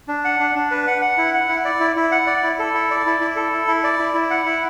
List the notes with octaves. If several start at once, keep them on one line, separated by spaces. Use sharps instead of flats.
D4
F#5
D4
D4
B4
F#5
F#5
E4
F#5
E4
D5
E4
E4
F#5
D5
E4
A4
E4
D5
E4
E4
A4
E4
E4
D5
E4
E4
F#5
E4